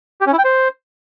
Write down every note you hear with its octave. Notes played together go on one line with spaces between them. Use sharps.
G4
C#4
E4
G5
C5